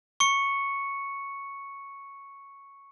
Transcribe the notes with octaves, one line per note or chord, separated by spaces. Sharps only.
C#6 C#7